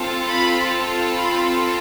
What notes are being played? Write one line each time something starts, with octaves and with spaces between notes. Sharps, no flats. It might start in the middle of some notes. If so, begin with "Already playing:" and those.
Already playing: C4 F4 A4
B5
B5